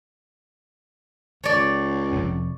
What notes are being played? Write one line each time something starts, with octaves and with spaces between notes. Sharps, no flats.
C#2 C#5 D5
F1 F2